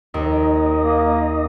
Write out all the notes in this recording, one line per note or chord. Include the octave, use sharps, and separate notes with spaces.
D#2 D#4 D#5
A#3